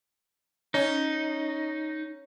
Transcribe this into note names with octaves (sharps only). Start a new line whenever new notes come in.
C#4 D#4